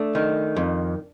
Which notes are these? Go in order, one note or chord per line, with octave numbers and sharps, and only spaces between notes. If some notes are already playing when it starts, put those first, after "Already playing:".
Already playing: A3 D4
D#3
F2